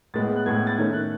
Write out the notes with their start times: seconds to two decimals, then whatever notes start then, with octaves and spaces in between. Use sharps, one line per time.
0.14 A2 G#3 B3 A6
0.36 F#6
0.46 A2 G#3 B3 G#6
0.56 G#6
0.67 A6
0.78 D#3 A3 C#4 G#6
0.93 F#6